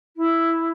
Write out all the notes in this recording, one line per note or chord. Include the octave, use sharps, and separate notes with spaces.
E4